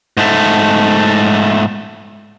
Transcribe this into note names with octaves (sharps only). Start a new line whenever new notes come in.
G#2 A3